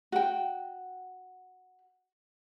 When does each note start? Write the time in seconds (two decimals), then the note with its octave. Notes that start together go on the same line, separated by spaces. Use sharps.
0.12 F#4 G5